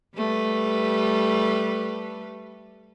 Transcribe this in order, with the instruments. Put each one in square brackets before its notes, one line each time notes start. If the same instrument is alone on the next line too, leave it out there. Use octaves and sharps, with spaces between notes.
[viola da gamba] G3 A3 B4